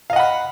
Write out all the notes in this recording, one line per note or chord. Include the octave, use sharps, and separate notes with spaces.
D#5 F5 F#5 B5